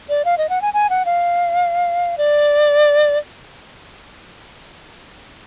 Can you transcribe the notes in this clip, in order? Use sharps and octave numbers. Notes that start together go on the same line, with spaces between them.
D5
F5
D#5
F#5
G#5
G#5
F#5
F5
D5